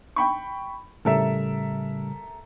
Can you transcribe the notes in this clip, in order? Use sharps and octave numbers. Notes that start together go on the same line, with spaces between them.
G5 B5 C#6
A2 C#3 G3 A4 A#4 E5